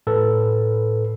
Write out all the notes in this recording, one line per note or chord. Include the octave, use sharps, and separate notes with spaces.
A2 A4 B4